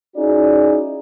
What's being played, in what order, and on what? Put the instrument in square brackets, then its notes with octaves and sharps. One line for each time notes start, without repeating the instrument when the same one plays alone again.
[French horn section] C#4 D#4 E4 F#4 G#4 D5